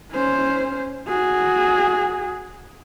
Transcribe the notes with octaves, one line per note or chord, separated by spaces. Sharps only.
C#4 C5
F#4 G#4